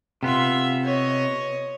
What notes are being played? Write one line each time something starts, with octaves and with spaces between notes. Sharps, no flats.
C3 B3 F4 E5
C#5 D#5